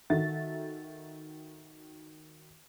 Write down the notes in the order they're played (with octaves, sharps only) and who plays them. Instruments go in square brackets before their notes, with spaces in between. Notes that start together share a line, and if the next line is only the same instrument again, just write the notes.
[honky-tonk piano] D#3 F#4 A4 E5 A6